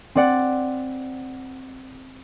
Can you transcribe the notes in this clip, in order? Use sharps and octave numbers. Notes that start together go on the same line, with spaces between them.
C4 D5 F#5